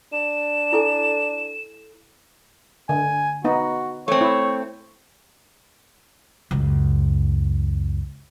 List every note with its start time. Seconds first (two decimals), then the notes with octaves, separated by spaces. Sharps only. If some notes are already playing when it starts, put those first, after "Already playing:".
0.13 D4 E7
0.73 E4 A4 G#5
2.89 D3 G#5
3.45 B3 D#4 F#4
4.08 A3 C4 C#5
4.21 E4
6.51 C#2 F#2